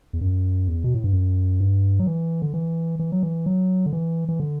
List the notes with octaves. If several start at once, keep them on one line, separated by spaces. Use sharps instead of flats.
E2
F#2
E2
B2
A2
G2
F#2
G2
F#3
E3
D3
E3
E3
F#3
E3
F#3
D3
E3
E3
D3